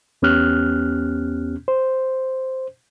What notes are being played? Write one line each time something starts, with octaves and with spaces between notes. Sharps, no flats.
E2 B3 C#4 G4 F6 F#6
C5